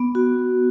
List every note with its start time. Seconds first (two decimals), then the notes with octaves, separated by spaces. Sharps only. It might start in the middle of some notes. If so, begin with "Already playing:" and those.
Already playing: B3
0.15 F#4